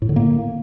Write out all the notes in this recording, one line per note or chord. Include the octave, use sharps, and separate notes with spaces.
A2
D3
A#3